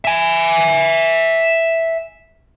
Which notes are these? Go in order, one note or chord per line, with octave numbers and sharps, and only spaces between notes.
E5 G#5